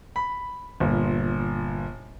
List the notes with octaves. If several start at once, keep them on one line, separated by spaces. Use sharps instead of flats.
B5
G1 A#2